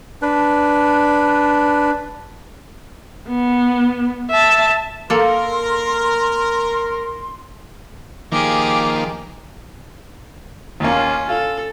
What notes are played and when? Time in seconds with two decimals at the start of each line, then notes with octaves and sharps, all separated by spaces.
0.22 D4 B4
3.28 B3
4.30 E5 A5
5.10 A#3 A4 A#4 C6
8.32 D#3 F3 A#3 G4 G#4 D6
10.80 D#2 A#3 C#4 F4
11.29 F4 A4